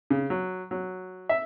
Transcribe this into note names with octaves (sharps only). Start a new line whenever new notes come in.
C#3
F#3
F#3
E5